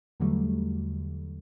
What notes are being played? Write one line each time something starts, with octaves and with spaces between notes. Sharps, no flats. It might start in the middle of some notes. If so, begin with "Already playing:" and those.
E2 D3 F#3 G3 A3